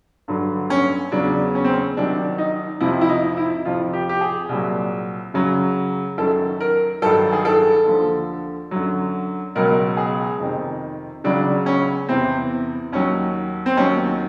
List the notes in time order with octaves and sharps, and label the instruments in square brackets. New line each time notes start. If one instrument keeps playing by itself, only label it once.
[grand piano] G2 D3 F#3
C#4
E2 C#3 F#3 D4
C#4
C4
C#4
C2 C3 D#3 F#3 D4
D#4
F2 C3 F3 E4
E4
D#4
E4
F2 C3 F3 F4
G4
G4
G#4
C2 A#2 F#3
F#2 C#3 F#3
F#2 D#3 F#3 A4
A#4
G2 D#3 F#3 A4
G#4
A4
D#2 D3 F3
F#2 D3 F#3
C#2 B2 F#3 A#4
G#4
F2 C3 D#3
C#2 C#3 F#3 D4
C#4
E2 C3 E3 C4
D#2 D#3 F#3 C#4
C4
D#2 D#3 F#3 C#4